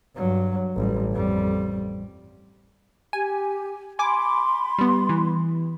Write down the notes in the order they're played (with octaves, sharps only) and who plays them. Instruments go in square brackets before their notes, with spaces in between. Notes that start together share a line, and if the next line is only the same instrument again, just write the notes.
[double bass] G2 F#3
A1 G3
F2 G3
[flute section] G4 [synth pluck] G#5
[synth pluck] G#5 D6 [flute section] B5 C6
[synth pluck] G3 B3
E3